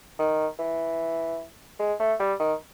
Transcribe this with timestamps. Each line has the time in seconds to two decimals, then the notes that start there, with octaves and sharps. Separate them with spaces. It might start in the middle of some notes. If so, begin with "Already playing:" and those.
0.19 D#3
0.59 E3
1.79 G#3
1.99 A3
2.20 G3
2.40 D#3